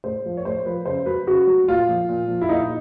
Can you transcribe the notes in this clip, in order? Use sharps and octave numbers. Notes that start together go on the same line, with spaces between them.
A2 C5
F3
C#5
A2 C5
F3 B4
C#3 C5
F#3 B4
C#3 F#4
F#3
A#2 F4
F3
A#2
F3
E4
A#2 D#4